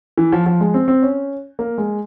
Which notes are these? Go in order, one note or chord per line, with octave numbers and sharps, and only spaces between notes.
E3
F3
F3
G#3
C4
C4
C#4
A#3
G#3